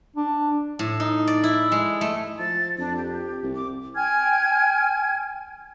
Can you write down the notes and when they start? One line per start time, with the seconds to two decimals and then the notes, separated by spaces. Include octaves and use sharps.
0.16 D4
0.79 A2
1.00 D#4
1.27 D5
1.43 E4
1.72 G#3
2.01 A3
2.39 F3 A6
2.78 F2 D4
2.96 G4
3.43 C2
3.55 D6
3.95 G5 G#5 F6 G#6